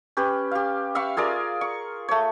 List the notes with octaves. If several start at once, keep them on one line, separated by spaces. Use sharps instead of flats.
C#4 G4 B4
G4 F5
E5 F5 B5 C#6
F4 G#4 A#4 D5
C#6
A3 C#5